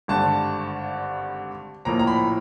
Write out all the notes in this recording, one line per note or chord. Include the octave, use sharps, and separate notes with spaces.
G#1 G2 D3 A5
A#1 A2 F3 A#3 A#5
A#5
B5